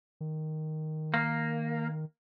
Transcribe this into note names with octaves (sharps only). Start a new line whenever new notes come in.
D#3
A#3